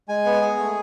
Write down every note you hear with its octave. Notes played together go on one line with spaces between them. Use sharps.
G#3 G#5
B3
G#4
A3